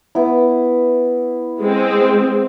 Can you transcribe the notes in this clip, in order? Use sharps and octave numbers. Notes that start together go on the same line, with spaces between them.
B3 E4
G#3 C4